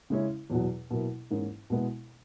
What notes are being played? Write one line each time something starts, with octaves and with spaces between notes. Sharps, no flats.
C#3 G#3 C#4 E4
E2 B2 F#3
B2 F#3 A#3 E4
G#2 E3 A#3 C#4
B2 G#3 B3 E4